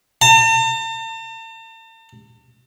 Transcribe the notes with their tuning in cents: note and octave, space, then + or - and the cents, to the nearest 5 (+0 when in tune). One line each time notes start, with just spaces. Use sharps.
A5 +45